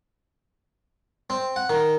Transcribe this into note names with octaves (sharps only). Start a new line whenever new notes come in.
C4
F#5
D#3